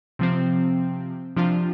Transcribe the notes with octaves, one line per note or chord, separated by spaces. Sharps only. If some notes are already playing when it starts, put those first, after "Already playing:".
C3 F3 C4
C3 F3 D4 F4